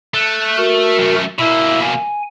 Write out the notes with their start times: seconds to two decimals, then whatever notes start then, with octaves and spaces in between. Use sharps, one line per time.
0.14 A3 F#6
0.57 F#4 A#4
0.99 F#2 A3
1.39 B2 A#3 E4 E5 E6
1.81 G#5